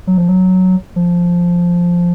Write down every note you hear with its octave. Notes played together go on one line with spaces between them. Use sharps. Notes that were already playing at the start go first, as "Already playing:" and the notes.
F#3
F3
F#3
F3